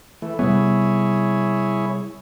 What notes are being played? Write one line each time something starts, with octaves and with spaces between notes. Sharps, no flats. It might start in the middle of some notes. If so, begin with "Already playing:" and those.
E3 A3
C3 G3 B3 E4 G#4 C#5